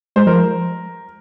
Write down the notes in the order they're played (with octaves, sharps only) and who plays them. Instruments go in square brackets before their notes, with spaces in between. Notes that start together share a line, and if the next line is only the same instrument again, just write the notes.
[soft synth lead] G#3 [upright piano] C5
[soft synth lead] F3 [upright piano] A#4